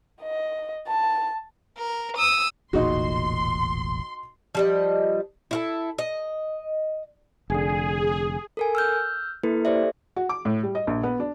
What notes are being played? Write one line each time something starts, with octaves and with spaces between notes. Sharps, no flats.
D#5
A5
A#4
D#6 E6
E1 A1 A#2 D#4 F#4 C6
F3 G3 D#5
E4 F4 A4
D#5
F1 D3 G#4
A4 A#4 G#5
E6 F6 G6
A#3 E4 A4 B4
G4 A4 C5 D5 E5
F#4
D6
A2
G3
D#5
A#1
B3
D4